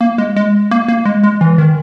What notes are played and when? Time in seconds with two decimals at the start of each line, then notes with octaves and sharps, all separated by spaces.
0.01 A#3
0.18 G#3
0.36 G#3
0.71 A#3
0.88 A#3
1.05 G#3
1.23 G#3
1.41 E3
1.58 D#3